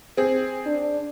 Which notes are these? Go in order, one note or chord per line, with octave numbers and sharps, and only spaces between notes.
C4 G#4
D4